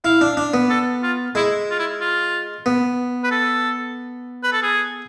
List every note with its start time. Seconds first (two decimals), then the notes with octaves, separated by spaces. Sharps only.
0.05 E4 F5
0.21 D4
0.37 D4
0.54 B3
0.70 A4
1.03 F4
1.35 G#3 E4
1.70 F4
1.78 E4
2.01 F4
2.66 B3
3.24 B4
3.31 A4
4.43 B4
4.52 A4
4.62 G#4